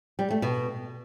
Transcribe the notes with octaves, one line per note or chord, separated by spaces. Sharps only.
G3
A3
B2